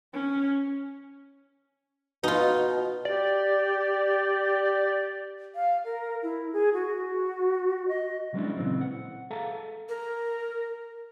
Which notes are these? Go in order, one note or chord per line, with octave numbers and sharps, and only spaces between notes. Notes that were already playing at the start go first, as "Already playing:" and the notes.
C#4
B2 D#4 F4
G4 D5
F5
A#4
E4
G#4
F#4
D#5
F#3 G#3 B3 C#4 D4 E4
A#2 C#3 E3 C4
F#5
G#4 A4 E5 F5 A5 A#5
A#4